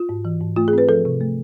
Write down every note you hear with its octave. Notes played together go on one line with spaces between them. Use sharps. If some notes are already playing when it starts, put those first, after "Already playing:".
Already playing: F4
G#2
E3
G#2
A3 F4
G#4
C4 B4
F3 A4
C3
A3